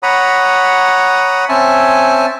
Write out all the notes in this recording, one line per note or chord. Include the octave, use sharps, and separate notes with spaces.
C#5 F#5 A#5 B5 D#6
C4 C#4 E5 G#5 A5